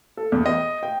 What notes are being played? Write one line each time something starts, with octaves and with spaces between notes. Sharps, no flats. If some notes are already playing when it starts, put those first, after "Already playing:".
A4
E2
D#5
G5